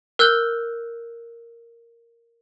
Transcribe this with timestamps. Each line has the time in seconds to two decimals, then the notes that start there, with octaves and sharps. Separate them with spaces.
0.19 A#4 E6 F#6 G6 G7